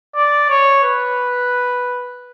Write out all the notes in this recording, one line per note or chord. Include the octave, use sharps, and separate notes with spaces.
D5
C#5
B4